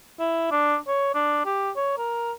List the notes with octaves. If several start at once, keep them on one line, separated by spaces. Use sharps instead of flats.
E4
D4
C#5
D4
G4
C#5
A#4